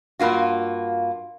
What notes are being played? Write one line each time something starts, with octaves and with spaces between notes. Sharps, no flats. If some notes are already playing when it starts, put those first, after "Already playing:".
G2 A#3 F4 F#4